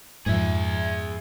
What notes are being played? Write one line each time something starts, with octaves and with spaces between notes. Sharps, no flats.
F2 G#2 G#4 E5